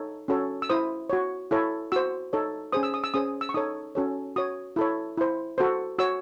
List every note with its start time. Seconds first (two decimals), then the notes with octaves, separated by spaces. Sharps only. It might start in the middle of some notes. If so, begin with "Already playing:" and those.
Already playing: D#4 A4 C#5
0.28 C#4 F#4 A4 C#5
0.62 E6
0.69 E4 C5 D#6
1.10 F#4 C#5
1.51 E4 A4 C#5
1.92 F#4 C5 E6
2.33 D#4 A4 C#5
2.72 C#4 G#4 C5 D#6
2.83 E6
2.94 D#6
3.04 E6
3.14 C#4 G#4 C5 D#6
3.41 E6
3.49 C#6
3.54 D#4 A4 C#5 D#6
3.95 C#4 F#4 A4 C#5
4.36 F#4 C#5 D#6
4.76 E4 A4 C#5
5.17 E4 C5
5.58 F#4 A4 C5
5.99 F#4 C#5 E6